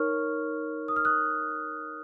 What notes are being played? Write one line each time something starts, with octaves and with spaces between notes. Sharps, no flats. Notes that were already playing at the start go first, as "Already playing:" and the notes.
Already playing: D#4 A#4 C#5 C#6 F6
D#6
F6
D#6 F#6